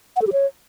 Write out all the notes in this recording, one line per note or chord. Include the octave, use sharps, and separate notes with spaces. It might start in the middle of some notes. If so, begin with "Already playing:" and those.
F#5
A4
G4
C#5